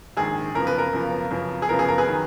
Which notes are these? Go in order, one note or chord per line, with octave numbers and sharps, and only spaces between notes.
A#1 G#2 D#3 G#4
F#2 C#3 F3 B3 A#4
B4
A#4
F#2 C#3 F3 B3
F#2 C#3 F3 B3
G#4
F#2 C#3 F3 B3 A#4
G#4
A#4
G#4 B4
D#3 F#3